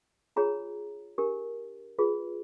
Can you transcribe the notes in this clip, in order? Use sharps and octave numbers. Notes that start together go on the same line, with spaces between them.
D4 F4 G#4 C#5 A#5
D4 G4 A#4
F4 G#4 B4